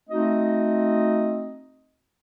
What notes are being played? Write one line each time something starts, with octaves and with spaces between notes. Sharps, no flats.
A3 C4 D#4 F#4 D#5